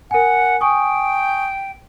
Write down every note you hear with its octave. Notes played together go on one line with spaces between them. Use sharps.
A#4 F#5 G#5
G5 G#5 C#6 D#6